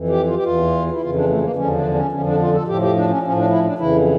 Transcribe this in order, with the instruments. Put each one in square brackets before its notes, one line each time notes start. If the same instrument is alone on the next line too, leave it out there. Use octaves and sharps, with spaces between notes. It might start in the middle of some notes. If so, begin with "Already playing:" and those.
Already playing: [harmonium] F2 E3
G4
F4
G4
E2 E3 F4
E4
F2 C#3 E3 F4
D4
A3
A#3
E2 D3 F3 C#4
D4
C#4
F2 D3 F3 C#4
D4
F4
A4
A2 F3 G4
G4
D4
C#4
A2 F3 C#4
D4
E4
D4
F2 C#3 E3 E4